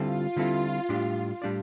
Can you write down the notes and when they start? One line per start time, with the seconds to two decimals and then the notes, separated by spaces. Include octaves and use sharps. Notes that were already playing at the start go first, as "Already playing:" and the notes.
Already playing: D3 G3 C4 E4 F4 A4
0.36 D3 G3 C4 E4 A4
0.89 A2 G3 D4 G4 D5
1.42 A2 G3 D4 G4 D5